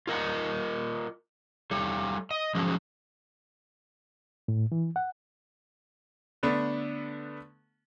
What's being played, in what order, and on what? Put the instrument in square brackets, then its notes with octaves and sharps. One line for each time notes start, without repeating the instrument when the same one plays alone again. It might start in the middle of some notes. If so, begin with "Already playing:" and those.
[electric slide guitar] F4 A#4 D#5 F#5
G3 A4 C#5
D#5
F3 F#3 G#3 C#4
[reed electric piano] A2
E3
F#5
[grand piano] D3 A3 B3 D4